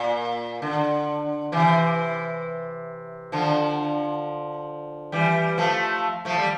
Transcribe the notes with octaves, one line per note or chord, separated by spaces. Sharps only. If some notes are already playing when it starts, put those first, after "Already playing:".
Already playing: A#2
D3
C3 E3
D3 F3
E3 G3
F3 A3
F3 A3
G3